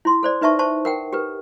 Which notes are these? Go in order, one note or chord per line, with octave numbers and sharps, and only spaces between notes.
E4 C6
A4 C5 D5
D#4 B4 E5 A5 C#6
C5 A5 C#6
A#4 F#5 G5
G4 A#4 B4